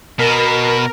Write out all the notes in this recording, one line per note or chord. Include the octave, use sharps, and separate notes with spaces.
B2 A#4